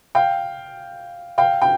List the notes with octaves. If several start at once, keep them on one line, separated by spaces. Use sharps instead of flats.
F5 G5
F5 G5
G5